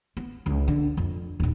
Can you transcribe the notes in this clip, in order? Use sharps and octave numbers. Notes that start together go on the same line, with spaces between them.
B3
C#2
D3
F2
D#1 D#4